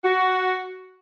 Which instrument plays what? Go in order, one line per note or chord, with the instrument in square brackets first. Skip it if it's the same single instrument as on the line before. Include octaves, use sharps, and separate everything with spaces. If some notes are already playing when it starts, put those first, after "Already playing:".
[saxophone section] F#4